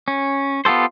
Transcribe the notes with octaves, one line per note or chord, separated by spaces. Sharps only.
C#4
B3 F4 G4 A4 C5